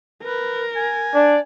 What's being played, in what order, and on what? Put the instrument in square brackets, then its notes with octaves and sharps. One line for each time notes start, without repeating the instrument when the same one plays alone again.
[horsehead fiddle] A#4 [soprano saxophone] B4
[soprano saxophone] G#5
[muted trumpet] D4 [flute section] D5